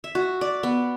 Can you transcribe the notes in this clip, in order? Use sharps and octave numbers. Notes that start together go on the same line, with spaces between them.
E5
F#4
D5
B3